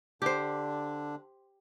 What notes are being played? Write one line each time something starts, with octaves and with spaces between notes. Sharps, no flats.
D3 D4 G4 C5